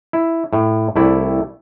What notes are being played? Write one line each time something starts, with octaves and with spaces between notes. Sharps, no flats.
E4
A2
C2 A3 E4 D5